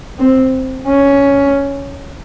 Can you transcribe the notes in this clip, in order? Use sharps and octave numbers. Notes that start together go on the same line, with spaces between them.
C4
C#4